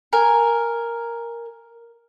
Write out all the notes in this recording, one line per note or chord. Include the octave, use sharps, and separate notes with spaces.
A#4 G#5